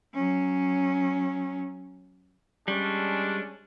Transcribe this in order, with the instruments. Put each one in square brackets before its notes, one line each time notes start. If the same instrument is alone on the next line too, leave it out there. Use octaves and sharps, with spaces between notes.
[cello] F#3 C#4
[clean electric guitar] G3 [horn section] G#3 C#4 D4